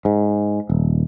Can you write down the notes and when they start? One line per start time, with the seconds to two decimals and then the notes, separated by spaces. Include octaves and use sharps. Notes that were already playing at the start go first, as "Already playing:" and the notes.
0.05 G#2
0.70 D#1